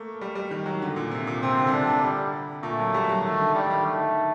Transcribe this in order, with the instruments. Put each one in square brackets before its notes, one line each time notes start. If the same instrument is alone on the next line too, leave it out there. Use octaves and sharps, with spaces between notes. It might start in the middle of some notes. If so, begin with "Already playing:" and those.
Already playing: [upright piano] A3 A#3
G3
G3
D#3
F#3
D3
A#2
C3
A#2
[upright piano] C3 [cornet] C4
[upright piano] D3
C3
[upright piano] D3 [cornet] D4
[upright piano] D3
[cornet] G3
[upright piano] A#2 [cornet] A3
[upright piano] F#3
G3
F#3
[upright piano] D#3 [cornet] A3
[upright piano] D3
[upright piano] D#3 [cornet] G3
[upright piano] D#3
[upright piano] D#3 [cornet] A3